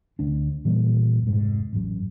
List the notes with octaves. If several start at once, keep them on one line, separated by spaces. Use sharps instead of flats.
D2 D4
A#2 E3 G3 A#3
F1 G#2
A1 F#2